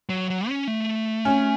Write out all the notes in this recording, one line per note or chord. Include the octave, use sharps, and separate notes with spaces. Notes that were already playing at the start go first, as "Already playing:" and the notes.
F#3
F#3
C#4
A3
C#4